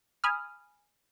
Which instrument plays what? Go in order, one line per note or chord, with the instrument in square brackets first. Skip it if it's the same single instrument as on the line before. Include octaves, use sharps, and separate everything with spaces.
[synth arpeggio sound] G#5 B5 D#6 F6